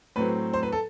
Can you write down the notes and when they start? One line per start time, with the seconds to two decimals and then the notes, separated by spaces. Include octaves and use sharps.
0.16 A2 F#3 C4 B4
0.53 C5
0.63 B4
0.72 A4